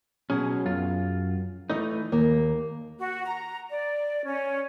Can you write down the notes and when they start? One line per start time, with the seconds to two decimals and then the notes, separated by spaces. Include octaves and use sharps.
0.30 B2 F#3 C#4 G#4
0.66 F#2 F4
1.70 E3 A3 D#4 D#5
2.12 D#2 A#3
2.99 F#4
3.26 A#5
3.70 D5
4.24 C#4